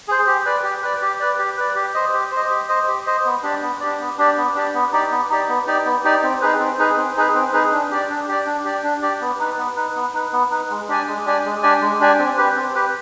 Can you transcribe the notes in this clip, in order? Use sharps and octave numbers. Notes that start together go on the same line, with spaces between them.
G#4 C5
G4
B4 D5
G4
B4 D5
G4
B4 D5
G4
B4 D5
G4
C5 D#5
G4
C5
D#5
G4
C5 D#5
G4
C5 D#5
B3
D4 G4 D5
B3
D4 G4 D5
B3
D4 G4 D5
B3
D4 G4 D5
B3
D#4 G4 D5
B3
D#4 G4 D5
B3
D#4 G4 D5
B3
D#4 G4 D5
C4
D#4 G#4 B4
C4
D#4 G#4 B4
C4
D#4 G#4 B4
C4
D#4 G#4 B4
D4
G4 D5
D4
G4 D5
D4
G4 D5
D4
G4 D5
B3
D#4 B4
B3
D#4 B4
B3
D#4 B4
B3
D#4 B4
G#3
D4 G4 D5 G#5
G#3
D4 G4 D5 G#5
G#3
D4 G4 D5 G#5
G#3
D4 G4 D5 G#5
C4
G4 B4
C4
G4 B4